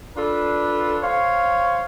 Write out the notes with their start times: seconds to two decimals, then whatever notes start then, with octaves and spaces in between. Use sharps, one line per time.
0.17 D4 F4 A4 B4
1.03 C5 C#5 F5